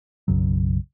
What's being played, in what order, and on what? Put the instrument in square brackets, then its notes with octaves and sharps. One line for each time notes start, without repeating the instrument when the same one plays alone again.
[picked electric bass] B1 F#2 C#3 F#3